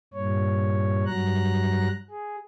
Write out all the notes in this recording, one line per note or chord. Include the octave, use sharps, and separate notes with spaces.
G2 A#2 C#5
G2 F#3 A#5 F#6
G#4